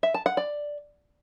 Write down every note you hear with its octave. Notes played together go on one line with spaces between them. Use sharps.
E5
A5
F#5
D5